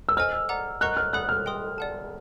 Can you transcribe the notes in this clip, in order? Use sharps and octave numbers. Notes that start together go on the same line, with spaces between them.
E6
C5 D#5 G#5 F6
D5 F#5 A#5 D6
A#4 D#5 F#5 A#5 C#6 F#6
F6
A4 D5 F#5 B5 D#6 F#6
F6
D#5 G5 C6 D#6
D5 F#5 A5